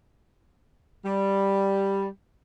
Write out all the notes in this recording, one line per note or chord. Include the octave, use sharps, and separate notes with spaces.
G3